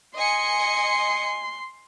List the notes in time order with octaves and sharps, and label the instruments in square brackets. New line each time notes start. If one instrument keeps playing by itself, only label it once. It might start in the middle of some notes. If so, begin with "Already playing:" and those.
[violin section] D#5 G#5 C#7 [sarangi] C6